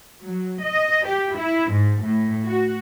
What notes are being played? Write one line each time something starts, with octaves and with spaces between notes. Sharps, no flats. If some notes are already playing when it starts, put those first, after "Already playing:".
F#3
D#5
G4
E4
G#2
A2
F#4